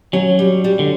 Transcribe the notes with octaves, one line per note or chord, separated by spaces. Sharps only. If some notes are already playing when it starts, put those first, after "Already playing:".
F#3 C#4
G3
G3
D3